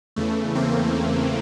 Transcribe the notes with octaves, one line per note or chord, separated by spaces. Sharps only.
E2 C#3 E3 A3
A#3 C4